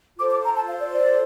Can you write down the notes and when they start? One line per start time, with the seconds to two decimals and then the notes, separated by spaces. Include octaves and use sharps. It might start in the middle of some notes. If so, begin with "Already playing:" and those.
0.18 F4 A4 C5 D6
0.30 D6
0.43 A#5
0.56 A5
0.68 F5
0.80 D5
0.93 D5